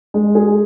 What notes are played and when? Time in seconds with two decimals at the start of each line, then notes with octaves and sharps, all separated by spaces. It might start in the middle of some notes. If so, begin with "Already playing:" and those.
0.14 G#3
0.35 G#4